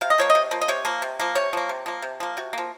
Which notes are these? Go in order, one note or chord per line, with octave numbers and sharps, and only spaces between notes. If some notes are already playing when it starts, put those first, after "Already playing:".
C3 F5
D#5
F3 A#3 C#5
D#5
C3
F3 A#3
D#5
C3 C#5
F3 A#3
C3
F3 A#3
C3 C#5
F3 A#3
C3
F3 A#3
C3
F3 A#3
C3 F#4
F3 A#3